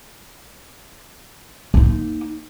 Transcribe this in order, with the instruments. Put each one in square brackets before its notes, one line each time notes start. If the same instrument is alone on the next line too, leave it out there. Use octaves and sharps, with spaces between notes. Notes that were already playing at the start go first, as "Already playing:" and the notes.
[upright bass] A#3 D#4